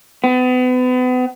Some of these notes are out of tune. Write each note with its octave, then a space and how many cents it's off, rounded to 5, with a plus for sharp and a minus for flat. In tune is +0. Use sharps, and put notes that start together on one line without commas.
B3 +35